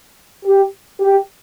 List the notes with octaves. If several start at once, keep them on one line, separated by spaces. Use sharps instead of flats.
G4
G4